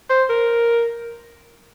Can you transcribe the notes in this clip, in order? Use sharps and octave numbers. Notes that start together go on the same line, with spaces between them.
C5
A#4